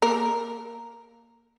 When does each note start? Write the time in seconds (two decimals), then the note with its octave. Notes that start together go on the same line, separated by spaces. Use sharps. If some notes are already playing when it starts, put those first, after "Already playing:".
0.02 A#3 A#4